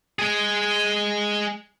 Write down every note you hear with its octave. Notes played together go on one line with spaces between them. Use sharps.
G#3 G#4